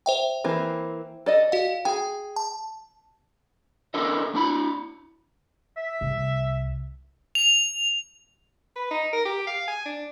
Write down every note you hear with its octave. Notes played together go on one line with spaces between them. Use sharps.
C5 E5 G5
E3 A#3 C4
A4 D5 D#5
F#4 F5
G#4 G5
A5
C#4 D4 E4 A4 A#4 D#5
D4 E4 B5
E5
C2
F7
B4
D#4
A#4
G4
F5
G#5
D4